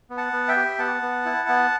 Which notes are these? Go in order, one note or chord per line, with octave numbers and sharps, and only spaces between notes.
B3
F#5 A5
B3
E5 G5
G4
B3 F#5 A5
B3
E4
B3